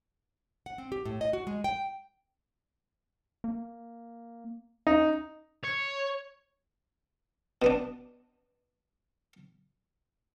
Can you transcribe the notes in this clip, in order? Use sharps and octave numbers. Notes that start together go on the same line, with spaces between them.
F#5
C4
G4
A2
D#5
F#4
G#3
G5
A#3
C#4 D#4
C#5
B2 B3 D4